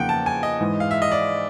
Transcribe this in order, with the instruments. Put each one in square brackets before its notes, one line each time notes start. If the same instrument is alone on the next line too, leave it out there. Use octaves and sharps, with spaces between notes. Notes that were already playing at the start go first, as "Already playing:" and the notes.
Already playing: [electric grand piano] E2 C#3 F3 A#3 D#4 [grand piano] F#5 G5
[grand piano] A5
G#5
D#5
[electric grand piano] G#2 E3 G#3
[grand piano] F5
E5
D#5
D5